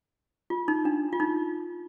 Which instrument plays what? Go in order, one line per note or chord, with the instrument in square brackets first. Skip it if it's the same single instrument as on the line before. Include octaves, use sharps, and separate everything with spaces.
[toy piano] F4
D#4
D4
F4
D#4